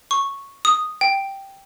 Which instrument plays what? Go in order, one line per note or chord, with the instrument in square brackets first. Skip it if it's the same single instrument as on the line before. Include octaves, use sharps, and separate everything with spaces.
[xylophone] C#6
D#6
G5